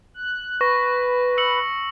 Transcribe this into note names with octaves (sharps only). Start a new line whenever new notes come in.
F#6
B4 C#6 A#6
E6 C#7 F#7